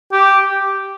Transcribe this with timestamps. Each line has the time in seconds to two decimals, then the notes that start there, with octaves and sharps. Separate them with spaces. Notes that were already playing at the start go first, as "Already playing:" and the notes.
0.12 G4